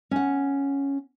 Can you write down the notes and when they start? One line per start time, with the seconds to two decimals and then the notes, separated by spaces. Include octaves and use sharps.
0.11 C#4 F#5